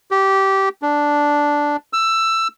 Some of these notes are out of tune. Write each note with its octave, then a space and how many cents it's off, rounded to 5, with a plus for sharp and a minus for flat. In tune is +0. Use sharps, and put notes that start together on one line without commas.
G4 -15
D4 -5
E6 +15